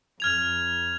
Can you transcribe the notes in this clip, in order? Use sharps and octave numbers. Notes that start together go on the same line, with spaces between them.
F2 F6 G#6 F7